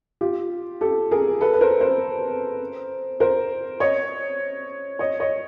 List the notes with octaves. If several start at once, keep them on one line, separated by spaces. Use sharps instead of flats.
F4 G4
G4 A4
G#4 A#4
A4 B4
B4
A#4 C5
A#4 C5
A#4 C5
C#5 D#5
C#5 D#5
C#5 D#5